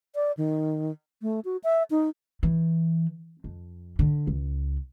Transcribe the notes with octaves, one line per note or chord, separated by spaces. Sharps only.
D5
D#3
A3
F#4
E5
D#4
E3
F2
D3
C#2